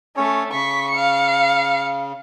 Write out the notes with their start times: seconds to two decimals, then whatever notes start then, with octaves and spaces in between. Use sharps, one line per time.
0.17 A3 C#4 C#5
0.53 C#3 C#6 B6
0.91 F5 C#7